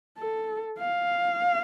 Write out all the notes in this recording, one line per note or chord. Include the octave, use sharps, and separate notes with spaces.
A4
F5